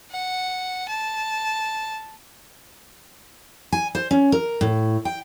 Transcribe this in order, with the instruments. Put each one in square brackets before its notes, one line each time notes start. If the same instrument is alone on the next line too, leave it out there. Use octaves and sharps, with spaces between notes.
[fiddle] F#5
A5
[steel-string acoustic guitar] G#5
C5
C#4
A#4
A2
G5